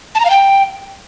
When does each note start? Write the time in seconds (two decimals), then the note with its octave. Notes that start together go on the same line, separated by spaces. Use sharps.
0.15 A5
0.20 A#5
0.25 F5
0.30 G5